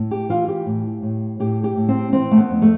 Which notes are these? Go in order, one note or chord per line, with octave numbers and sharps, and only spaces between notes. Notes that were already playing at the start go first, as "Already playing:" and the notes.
Already playing: A2
G4
E3 F4
G4
A2
A2
A2 G4
G4
A2
C4
E3 C4
A3
B3
F2
A3